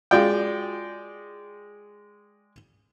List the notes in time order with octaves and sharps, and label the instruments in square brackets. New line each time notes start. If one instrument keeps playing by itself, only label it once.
[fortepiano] G#3 D5 G5 [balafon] F4 F#4 F5